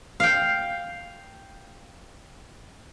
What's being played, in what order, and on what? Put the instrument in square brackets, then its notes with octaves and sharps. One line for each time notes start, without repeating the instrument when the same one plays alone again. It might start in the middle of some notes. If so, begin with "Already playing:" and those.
[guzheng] F5 G5